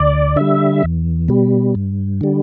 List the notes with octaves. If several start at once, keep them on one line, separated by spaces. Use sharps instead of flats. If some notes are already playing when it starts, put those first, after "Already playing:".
Already playing: D2 D5
D3 G3 E5
E2
B2 G3
G2
D3 G3